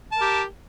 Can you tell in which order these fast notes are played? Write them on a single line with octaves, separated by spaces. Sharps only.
A5 A#4 G4